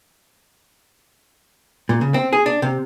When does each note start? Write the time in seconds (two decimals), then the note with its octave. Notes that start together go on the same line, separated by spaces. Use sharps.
1.89 A#2
2.01 C#3
2.14 C4
2.33 G#4
2.46 D4
2.62 C3